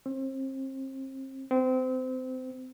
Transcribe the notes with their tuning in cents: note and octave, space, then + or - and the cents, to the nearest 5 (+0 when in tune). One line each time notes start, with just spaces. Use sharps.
C4 +35
C4 -25